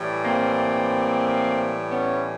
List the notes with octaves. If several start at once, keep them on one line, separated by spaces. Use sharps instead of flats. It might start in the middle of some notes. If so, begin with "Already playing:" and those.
Already playing: A2 E3 G3
A#3 C4
B3 C#4